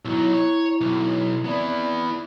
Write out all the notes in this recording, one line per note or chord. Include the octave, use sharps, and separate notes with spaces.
B1 F#3 E4 A#5
C#5
B1
B3 C4 E4 D5